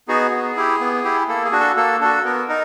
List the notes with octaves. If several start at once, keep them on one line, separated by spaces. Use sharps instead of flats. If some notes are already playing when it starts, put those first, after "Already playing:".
B3 D#4 F#4 G#4
B3
E4 G4
B3
E4 G4
A#3 A4
G#4
D4 F#4
A4
A#3 A4
D4 F#4 A4
B3 A#4
D#4 A#4